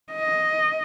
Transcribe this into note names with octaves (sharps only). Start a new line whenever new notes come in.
D#5